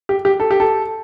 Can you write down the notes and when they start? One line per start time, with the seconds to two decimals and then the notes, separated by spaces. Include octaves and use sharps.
0.09 G4
0.25 G4
0.40 A4
0.51 G4
0.60 A4